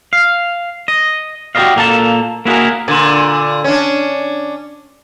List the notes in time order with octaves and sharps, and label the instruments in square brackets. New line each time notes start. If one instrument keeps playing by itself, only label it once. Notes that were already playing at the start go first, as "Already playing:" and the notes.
[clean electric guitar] F5
D#5
F#4 G4 B4 D5 D#5 F5
A#2 A#3 A4 A5
A#3 E4 F#4 G#4 A#4
[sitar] A#2 D3
C#4 D4